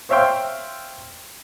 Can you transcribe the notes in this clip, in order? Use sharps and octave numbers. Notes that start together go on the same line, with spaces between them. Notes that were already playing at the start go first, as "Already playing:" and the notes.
C5 C#5 E5 F5 G5 C6